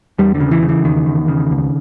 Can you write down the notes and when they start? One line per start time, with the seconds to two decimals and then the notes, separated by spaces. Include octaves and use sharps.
0.19 E2 G3
0.34 D3
0.40 C#3
0.51 E3
0.62 C#3
0.69 E3
0.84 E2 D#3
1.06 E2
1.28 C#3
1.51 C#2